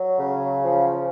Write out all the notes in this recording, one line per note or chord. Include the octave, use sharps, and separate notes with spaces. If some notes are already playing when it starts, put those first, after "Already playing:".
Already playing: F#3
C#3
F3